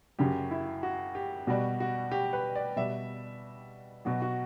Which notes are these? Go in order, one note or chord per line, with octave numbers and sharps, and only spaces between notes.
F#2 C#3 F#3 G4
E4
F#4
G4
B2 G3 F#4
F#4
G4
B4
D5
B2 G3 E5
B2 F#3 F#4
F#4